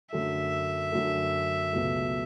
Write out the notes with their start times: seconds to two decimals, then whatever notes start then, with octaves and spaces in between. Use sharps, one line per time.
0.12 F#2 D3 F#3 A3 E5
0.92 F#2 D3 F#3 A3
1.73 C#2 B2 F#3 A3